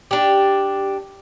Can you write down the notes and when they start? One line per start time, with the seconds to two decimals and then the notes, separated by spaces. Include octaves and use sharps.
0.11 D4 G4